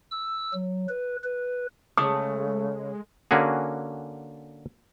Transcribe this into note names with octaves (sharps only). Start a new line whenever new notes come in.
E6
F#3
B4
B4
C#3 G#3 A3 D#6
D3 A#3 C#4 F#4 G#4